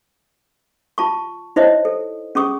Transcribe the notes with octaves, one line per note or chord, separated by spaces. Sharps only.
F4 A5 C#6
D#4 E4 C5 C#5 D#5 E5
A4
C#4 G#4 C#6 D#6